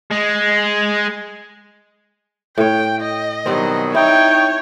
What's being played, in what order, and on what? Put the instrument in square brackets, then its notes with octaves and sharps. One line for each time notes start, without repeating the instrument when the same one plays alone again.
[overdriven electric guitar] G#3
[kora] A2 C#5 [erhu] G5
[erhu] D#5
[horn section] B2 D#3 F#3 [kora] G3 C4
[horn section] D#4 G5 [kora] E4 [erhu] C#5